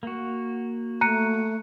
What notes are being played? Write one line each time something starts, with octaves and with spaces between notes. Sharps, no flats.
A#3 F#4
A3 A#5 F#6 C#7 D#7